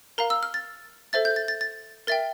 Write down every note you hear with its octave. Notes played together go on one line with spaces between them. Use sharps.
A#4 F5 A#5
E6
F6
A6
A4 C5 E5 A6
G6
A6
A6
A6
A#4 E5 G5 A6